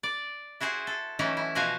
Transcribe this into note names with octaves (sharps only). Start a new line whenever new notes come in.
D5
E4 F#4 G#4 C5
A4
E3 F#3 A3 C#4 D#4 E4
E4
B2 F3 F#4 C5 F5 G#5